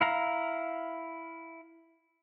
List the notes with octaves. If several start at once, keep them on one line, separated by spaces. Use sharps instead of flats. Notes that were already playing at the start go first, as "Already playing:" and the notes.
E4 F5 A#5